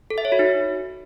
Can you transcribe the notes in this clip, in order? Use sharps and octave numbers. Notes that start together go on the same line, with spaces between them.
A4
E5
C#5
F#4
D#4